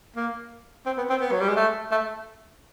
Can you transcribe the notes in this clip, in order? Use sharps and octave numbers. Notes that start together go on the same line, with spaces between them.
A#3
C4
B3
C4
B3
F#3
G3
G#3
A3
A3